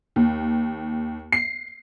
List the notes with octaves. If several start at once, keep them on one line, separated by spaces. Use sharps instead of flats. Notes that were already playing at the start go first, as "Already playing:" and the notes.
D#2
C7